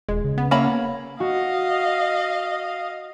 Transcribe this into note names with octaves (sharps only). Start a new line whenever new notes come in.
D#1 G#3
C#3
B3
A#3 C#5 E5 B5
B3
F#4 D#5 F5